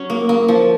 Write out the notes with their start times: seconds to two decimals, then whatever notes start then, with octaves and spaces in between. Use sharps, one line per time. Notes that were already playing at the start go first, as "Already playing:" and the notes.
Already playing: F#3 C#4
0.10 A#3
0.29 A#3
0.48 F3